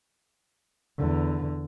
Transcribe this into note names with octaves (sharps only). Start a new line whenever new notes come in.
E2 D3